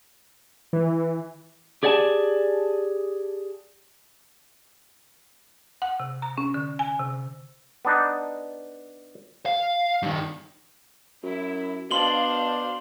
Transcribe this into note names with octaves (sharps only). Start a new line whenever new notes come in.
E3
G4 G#4 D5 F#5 G#5 A5
F#5
C3
A#5
C#4
D3
G#5
C3
B3 D4 D#4
F5
G2 D#3
F#2 E4
B2 D4 C5 F5 C6 F#7 G7